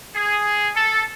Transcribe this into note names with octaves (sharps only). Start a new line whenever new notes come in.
G#4
A4